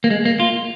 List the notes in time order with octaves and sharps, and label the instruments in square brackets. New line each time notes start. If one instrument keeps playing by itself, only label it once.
[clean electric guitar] A#3
G#3
A#3
F4